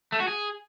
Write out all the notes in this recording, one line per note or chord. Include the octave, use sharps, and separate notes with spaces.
A3
F#4
G#4